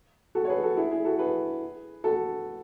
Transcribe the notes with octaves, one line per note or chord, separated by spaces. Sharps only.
F#4 A4
C#5
G#4 B4
F#4 A4
E4 G#4
E4 G#4
F#4 A4
G#4 B4
F#4 A4